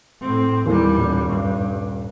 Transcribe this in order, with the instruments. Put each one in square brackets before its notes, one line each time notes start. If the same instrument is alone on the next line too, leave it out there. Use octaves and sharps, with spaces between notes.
[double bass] A2 C4
[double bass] D#2 G3 [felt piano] E3 A#3
[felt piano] D#1
[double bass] G2